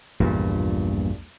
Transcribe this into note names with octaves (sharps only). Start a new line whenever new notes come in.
A#1 E2 G2 A#2